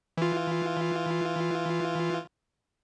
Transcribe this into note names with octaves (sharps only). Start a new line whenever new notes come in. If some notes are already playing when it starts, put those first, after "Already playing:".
E3 F4